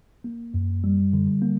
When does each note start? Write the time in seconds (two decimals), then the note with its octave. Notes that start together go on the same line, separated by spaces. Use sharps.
0.24 A#3
0.54 F#2
0.84 G3
1.13 D3
1.42 A#3